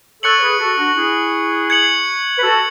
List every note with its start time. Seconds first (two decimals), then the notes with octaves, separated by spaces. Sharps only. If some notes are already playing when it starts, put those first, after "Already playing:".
0.23 A4 C#5 C#6 F#6 C#7 F#7
0.42 G#4 B4
0.59 F#4 A4
0.78 D4 F#4
0.97 E4 G#4
1.70 G#6 C#7 F#7
2.38 B4
2.43 F#4 A4